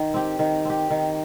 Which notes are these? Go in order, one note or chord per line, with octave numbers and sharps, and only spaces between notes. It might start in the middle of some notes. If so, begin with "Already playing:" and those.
Already playing: D#3
C4 G4
D#3
C4 G4
D#3